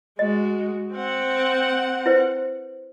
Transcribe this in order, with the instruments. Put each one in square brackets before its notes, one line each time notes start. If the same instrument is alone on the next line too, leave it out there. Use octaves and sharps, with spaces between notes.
[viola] G#3 F#4 [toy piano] D#5
[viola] C4 F#5
[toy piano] E4 B4 C5